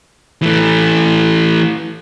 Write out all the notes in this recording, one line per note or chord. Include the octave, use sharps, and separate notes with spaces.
E3 A3